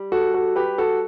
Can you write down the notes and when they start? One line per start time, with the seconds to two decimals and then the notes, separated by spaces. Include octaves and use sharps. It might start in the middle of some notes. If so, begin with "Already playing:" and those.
Already playing: G3
0.12 F#4 A4
0.34 F#4 A4
0.56 G4 B4
0.78 F#4 A4